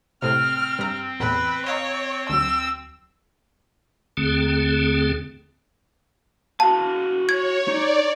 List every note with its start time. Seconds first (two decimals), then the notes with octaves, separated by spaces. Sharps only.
0.22 A2 C3 C4 F6
0.79 G2 A#5
1.20 E2 A2 B4
1.66 C#5 D#5 F5 A#5
2.29 D2 F#3 E6
4.17 D#2 D3 A3 C4 G#4
6.60 F#4 F5 A5
7.29 C#5 G#6
7.68 D#4 D5